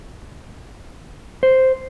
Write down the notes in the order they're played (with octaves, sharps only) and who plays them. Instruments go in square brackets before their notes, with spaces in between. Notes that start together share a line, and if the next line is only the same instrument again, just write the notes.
[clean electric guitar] C5